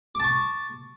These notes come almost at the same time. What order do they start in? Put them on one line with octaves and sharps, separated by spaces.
D6 A5 C#6